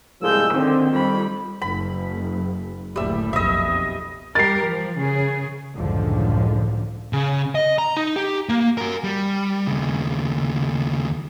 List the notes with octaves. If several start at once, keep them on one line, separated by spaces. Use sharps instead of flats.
C2 F3 G#3 E6 G6
D3 D#3 C4
F2 G3 B5
F#1 B5
F#1 D2 A2 G3 E5
B1 F2 D#5 E5
G3 G4 A#4 A6 C7
F3
C#3 G#4
C#2 F#2 A2 D3 D#3 F3
C#3
D#5
A#5
D#4
G4
A#3
F#4 A#4
G3
D#2 C#3